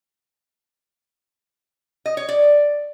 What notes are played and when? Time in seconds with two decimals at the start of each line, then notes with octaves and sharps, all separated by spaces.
2.06 D#5
2.17 C#5
2.29 D5